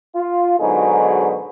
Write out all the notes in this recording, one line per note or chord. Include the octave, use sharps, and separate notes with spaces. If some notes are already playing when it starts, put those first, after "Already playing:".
F4
G#2 B2 D3 F#3 D#4 G#4